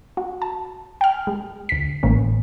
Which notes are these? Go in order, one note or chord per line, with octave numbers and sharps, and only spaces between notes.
F#4
A5
G5 F6
G#3
D2 B6
A1 A2 E3 A#3 B3 C#4